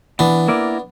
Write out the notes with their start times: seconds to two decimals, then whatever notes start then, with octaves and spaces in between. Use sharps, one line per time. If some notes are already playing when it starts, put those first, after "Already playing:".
0.19 E3 B3 D4
0.48 A#3 E4 A#4 D5